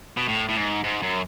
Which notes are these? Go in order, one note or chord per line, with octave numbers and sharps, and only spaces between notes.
B2
A2
A2
G#2
G#2
F#2